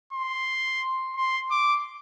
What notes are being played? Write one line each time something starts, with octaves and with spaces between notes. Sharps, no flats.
C6
C6
D6